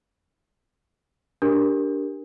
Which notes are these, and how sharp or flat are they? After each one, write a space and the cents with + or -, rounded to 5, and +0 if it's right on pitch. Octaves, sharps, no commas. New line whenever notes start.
D4 -5 G4 +0 A#4 +0